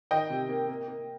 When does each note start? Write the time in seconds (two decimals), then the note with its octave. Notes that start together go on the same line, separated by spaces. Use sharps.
0.11 D#3 D#5 G5
0.30 C3
0.49 A#3
0.69 A#3
0.88 A#3